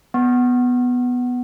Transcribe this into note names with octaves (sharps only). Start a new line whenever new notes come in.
B3